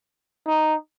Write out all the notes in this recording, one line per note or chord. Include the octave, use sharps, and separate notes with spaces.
D#4